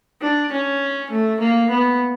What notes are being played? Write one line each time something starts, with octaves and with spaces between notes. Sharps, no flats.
D4
C#4
A3
A#3
B3